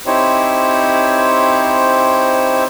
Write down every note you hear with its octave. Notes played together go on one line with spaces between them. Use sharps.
C4 D#4 E4 G4 C5 C#5